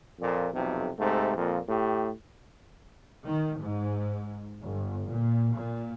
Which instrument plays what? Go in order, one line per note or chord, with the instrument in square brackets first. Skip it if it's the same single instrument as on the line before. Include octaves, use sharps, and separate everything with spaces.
[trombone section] F2 A#2
B1 F2 C3
G#2 C3 A3
F2 A#2
A2 G4
[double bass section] D#3
G#2
G1
A#2
A#2